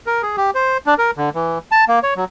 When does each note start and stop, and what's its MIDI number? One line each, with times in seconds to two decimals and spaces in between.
0.07 0.22 70
0.23 0.36 68
0.37 0.51 67
0.55 0.78 72
0.86 0.94 62
0.98 1.11 70
1.17 1.30 50
1.35 1.58 52
1.72 1.85 81
1.88 1.99 58
2.03 2.14 73
2.16 2.24 54